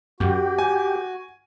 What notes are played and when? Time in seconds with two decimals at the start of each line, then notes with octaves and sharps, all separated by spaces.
0.20 F#2 F#4 G4
0.59 G#5